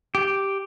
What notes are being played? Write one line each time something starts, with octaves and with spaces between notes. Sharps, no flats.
G4